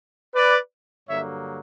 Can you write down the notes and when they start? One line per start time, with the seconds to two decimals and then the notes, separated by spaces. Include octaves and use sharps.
0.35 B4 D5
1.08 G2 D3 F#3 A#3 C#5 E5